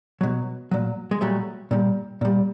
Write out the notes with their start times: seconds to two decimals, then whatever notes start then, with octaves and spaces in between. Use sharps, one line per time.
0.21 B2 F#3
0.71 A#2 F#3
1.11 G#3
1.21 A#2 F#3 G3 A3
1.71 A#2 G3
2.21 A#2 G3